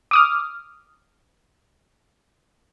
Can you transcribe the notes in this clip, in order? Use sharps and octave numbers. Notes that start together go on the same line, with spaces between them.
D6 D#6 F6